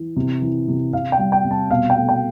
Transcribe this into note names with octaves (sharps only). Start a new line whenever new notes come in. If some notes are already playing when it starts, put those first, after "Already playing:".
Already playing: E3
C3
E3
C3
C3 F5
G5
G3
G5
C3
A5
B2 F5
G5
A3
G5